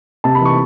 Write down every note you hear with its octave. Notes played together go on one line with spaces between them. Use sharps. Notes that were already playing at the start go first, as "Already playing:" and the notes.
C3 A5
B5
E3
C#6